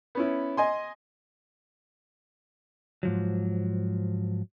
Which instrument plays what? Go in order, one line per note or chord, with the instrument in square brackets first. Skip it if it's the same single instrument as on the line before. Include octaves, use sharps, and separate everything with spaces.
[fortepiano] B3 C#4 E4
D#5 G#5 C6
[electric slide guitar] G#2 F3 F#3